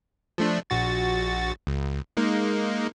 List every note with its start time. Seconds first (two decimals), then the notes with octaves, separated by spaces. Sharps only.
0.38 F3 A3 D4
0.70 A#1 F#4 A6
1.67 C#2
2.17 G#3 A#3 D#4